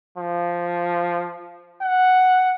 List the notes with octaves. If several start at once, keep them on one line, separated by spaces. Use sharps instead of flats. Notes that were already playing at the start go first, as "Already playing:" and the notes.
F3
F#5